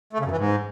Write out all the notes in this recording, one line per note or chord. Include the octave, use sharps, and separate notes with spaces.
A3
C#3
F#2
E3
G#2